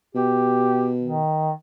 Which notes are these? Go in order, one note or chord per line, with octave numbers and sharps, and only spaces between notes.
B2 G4
D#3